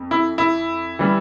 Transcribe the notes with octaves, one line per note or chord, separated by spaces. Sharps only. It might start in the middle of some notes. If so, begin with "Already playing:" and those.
Already playing: F2
E4
E4
E3 G3